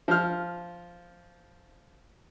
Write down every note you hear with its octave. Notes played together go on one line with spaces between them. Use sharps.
F3 F6